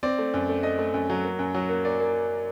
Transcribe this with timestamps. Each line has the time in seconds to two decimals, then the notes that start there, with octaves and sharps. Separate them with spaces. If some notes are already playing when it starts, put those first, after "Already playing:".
0.03 C4 D5
0.19 A3
0.34 F#2
0.49 A3
0.63 A3 D#5
0.79 A3
0.94 F#2
1.10 F#3
1.24 A#3
1.39 F#2
1.54 F#3
1.69 A#3
1.84 A#3 D5
2.00 A#3